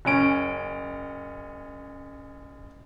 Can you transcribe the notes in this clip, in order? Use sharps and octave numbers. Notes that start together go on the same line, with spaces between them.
F#1 C#4 D7